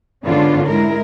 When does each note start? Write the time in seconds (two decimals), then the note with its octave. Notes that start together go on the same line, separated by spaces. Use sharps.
0.25 G#2 D3 B3 C#4 D4 F4
0.66 G#3 E4 A#4